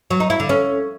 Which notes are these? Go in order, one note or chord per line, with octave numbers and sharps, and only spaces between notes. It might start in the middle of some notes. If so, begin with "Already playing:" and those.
F#3
D#4
E4
D3
C#4